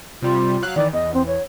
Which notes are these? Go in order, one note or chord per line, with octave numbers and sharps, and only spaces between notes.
C3 G3 F4
F#3 F5 F#6
D#3 E3 D5
E2 D#5
C4
C#5